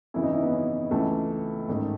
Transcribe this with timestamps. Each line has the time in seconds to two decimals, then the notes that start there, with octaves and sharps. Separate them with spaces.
0.14 G#1 F#2 C#3 E3 E4
0.23 D#4
0.32 E4
0.43 B3
0.52 C#4
0.91 C#2 C#3 E3 A3
1.68 A1 G#2 D#3